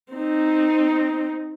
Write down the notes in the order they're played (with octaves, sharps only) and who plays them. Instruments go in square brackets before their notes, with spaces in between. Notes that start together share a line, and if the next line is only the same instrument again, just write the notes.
[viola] C4 D#4